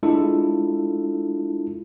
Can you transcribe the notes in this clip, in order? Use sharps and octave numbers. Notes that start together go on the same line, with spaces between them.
G#3 D4 E4 F4 A4